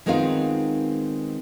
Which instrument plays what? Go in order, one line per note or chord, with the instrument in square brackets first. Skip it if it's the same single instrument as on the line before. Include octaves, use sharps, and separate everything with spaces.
[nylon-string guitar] D#3 G#3 B3 C4 D#4 F4